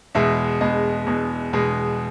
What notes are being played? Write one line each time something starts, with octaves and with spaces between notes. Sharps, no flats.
E2 B2 G#3 E5
E2 B2 G#3 D#5
E2 B2 G#3
E2 B2 G#3